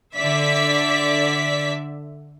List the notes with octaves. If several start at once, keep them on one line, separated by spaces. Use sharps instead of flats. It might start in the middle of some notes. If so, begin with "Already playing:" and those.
D3 D5 E5 B6